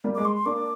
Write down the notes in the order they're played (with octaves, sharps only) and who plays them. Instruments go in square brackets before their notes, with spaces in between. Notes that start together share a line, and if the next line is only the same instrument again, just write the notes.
[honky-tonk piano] G3 A#3
[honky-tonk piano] G#3 [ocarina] D6
[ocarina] C6
C6
[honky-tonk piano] A#3 D4 [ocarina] D6